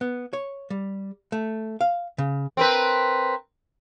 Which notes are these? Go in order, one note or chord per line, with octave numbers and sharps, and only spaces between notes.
B3
C#5
G3
A3
F5
C#3
C4 A#4 B4